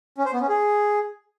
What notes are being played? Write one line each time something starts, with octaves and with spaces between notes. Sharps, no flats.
C#4
C5
B3
C#4
G#4